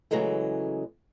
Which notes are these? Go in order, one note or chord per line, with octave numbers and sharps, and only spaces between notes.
C#3 E3 F#3 G#3 A3